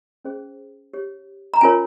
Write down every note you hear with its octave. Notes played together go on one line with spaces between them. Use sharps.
C#4 G#4 C5
G4 C#5
A#5
C#4 F4 A#4 C#5 G#5